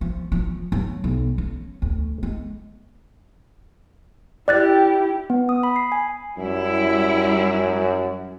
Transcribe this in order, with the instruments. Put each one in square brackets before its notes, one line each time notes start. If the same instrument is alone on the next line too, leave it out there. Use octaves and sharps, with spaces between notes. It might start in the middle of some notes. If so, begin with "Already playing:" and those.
[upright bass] F3
F3
F#3
B1
C#4
D2
G#3
[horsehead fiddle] E4 G4 [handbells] D5 F#6 A6
[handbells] B3
D#6
B5
C7
G#5
[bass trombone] F#2 [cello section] G3 E4